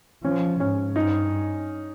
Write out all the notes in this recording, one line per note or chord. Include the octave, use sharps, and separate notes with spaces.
F3 C#4
G#2 C#4
G2 D#4